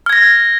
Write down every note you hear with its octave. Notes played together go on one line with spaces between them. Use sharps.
F6 G#6 A#6